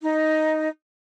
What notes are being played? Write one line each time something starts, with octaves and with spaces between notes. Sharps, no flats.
D#4